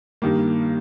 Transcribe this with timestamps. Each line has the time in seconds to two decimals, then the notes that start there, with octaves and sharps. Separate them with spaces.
0.22 G2 D#3 G3 A#3